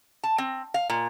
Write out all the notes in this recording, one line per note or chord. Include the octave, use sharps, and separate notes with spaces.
A5
C4
F5
A#2